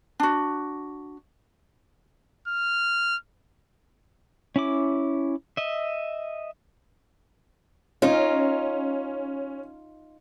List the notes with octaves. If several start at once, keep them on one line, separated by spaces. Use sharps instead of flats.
D4 F#4
F6
C#4 E4 D6
D#5 E5
C#4 D#4 F4